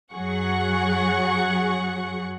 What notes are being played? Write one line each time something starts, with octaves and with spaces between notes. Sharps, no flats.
F#2 F#3 G#4 F#5 C#6